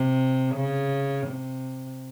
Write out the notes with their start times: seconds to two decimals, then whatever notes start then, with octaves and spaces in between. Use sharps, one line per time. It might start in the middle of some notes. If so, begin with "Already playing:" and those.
Already playing: C3
0.55 C#3
1.27 C3